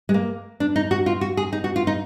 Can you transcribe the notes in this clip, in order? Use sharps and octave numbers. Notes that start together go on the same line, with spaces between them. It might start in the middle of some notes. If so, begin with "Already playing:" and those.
G#3
A#3
D4
D#4
F#4
F4
F#4
G#4
D#4
F#4
F4
D#4